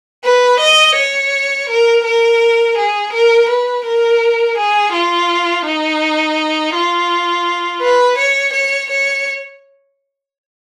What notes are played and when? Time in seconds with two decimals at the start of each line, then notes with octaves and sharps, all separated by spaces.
0.24 B4
0.60 D#5
0.96 C#5
1.69 A#4
2.04 A#4
2.77 G#4
3.13 A#4
3.49 B4
3.85 A#4
4.57 G#4
4.93 F4
5.66 D#4
6.74 F4
7.82 B4
8.18 C#5
8.54 C#5
8.90 C#5